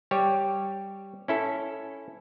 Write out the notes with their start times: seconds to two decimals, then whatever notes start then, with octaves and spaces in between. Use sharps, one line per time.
0.11 G3 G4 C#5
1.28 C#4 E4 A4